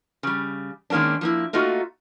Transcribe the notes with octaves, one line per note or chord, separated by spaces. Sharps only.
C#3 G3
D#3 G#3 A#3 C#4 D4
F3 A#3 E4
A3 A#3 D#4 F4 F#4